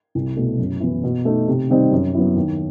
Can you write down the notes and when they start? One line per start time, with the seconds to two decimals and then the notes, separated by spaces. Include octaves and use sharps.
0.15 C2
0.36 B2 A3
0.58 F#2
0.80 E3 B3 E4
1.04 B2
1.25 A3 D#4
1.48 C3
1.69 D#3 G3 C4 D#4
1.91 F#2
2.15 F#3 B3 E4
2.37 D#2